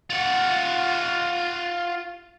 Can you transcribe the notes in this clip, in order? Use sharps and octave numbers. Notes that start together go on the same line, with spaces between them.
F4 F#5